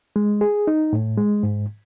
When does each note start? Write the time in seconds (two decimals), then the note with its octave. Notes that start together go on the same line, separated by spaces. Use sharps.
0.16 G#3
0.41 G#4
0.67 D#4
0.93 A2
1.18 G#3
1.43 G#2